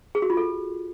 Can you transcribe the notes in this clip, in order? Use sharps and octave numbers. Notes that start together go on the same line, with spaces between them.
G#4
F#4
F4
A4